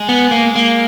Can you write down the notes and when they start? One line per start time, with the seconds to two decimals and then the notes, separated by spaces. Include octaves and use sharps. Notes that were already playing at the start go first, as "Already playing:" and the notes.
Already playing: G#3
0.09 B3
0.31 A#3
0.56 A#3